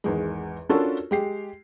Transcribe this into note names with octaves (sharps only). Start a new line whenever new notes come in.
G#1 E2 G#3
C#4 D4 F4 F#4 A4 A#4
G#3 G4 C7